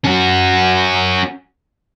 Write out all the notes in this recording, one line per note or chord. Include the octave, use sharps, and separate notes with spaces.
C#4 F#4